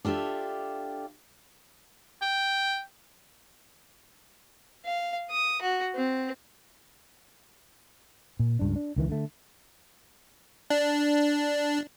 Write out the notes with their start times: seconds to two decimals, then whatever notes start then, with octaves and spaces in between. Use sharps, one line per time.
0.05 D4 F4 G4 A4 E5
2.22 G5
4.85 F5
5.31 D#6
5.62 F#4
5.95 C4
8.40 A#2
8.59 C#2 G2 D4
8.76 D4
8.96 C#2 D#3 E3
9.08 D3 A3
10.70 D4